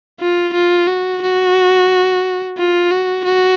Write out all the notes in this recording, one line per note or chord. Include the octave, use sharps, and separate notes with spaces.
F4
F4
F#4
F#4
F4
F#4
F#4